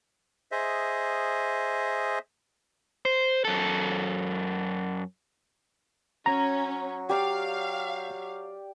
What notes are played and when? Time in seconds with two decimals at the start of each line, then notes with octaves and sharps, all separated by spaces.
0.52 G#4 C5 D#5 E5
3.05 C5
3.45 F#2 A4
6.26 F#3 C#4 A#5
7.09 G4 D5 F5